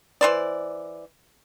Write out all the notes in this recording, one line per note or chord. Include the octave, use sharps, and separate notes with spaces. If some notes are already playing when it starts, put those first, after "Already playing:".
E3 C5 D5